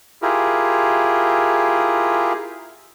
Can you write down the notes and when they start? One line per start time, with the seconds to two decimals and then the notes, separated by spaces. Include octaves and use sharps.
0.22 E4 F4 G4 G#4 A#4